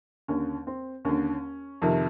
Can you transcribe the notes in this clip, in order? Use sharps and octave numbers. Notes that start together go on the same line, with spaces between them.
D#2 D3 C#4
C4
D#2 D3 C#4
F2 C3 D#3